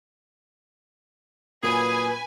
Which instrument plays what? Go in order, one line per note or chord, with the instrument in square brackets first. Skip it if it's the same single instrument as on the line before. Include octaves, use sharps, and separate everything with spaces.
[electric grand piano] A#2 F#3 [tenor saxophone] G#4 [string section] B4 G#5